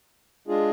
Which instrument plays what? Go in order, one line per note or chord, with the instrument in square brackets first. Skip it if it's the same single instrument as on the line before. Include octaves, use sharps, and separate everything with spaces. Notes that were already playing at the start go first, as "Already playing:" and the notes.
[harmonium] G#3 D4 F4 G#4